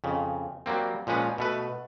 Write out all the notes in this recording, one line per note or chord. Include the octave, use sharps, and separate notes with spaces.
F2 C#3
F#3 G3 A#3 C4
A#2 F3 G#3 C#4 B4
B2 A3 B4